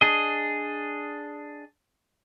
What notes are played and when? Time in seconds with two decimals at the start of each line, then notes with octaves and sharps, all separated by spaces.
0.01 D4 G#4 D#5